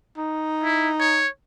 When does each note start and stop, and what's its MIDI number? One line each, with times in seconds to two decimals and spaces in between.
0.17 1.25 63
0.64 0.89 64
1.00 1.28 73